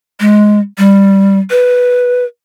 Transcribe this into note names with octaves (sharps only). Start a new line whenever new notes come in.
G#3
G3
B4